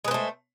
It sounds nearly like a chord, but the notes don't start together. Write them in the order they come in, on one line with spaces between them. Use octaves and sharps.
G#3 B4 C5 A3